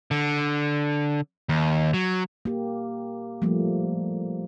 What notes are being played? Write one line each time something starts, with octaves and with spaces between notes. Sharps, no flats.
D3
D#2
F#3
A#3 G4
F3 G3 A3 A#3